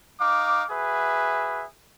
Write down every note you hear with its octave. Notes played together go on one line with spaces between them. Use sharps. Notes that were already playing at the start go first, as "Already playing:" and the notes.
D#4 F5 D6
F#4 G#4 B4 E5